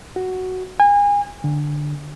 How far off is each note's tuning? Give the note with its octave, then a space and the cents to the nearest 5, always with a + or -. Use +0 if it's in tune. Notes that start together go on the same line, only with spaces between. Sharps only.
F#4 +5
G#5 -30
D3 +10